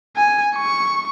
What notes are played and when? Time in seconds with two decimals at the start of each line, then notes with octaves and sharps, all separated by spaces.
0.17 G#5
0.56 C#6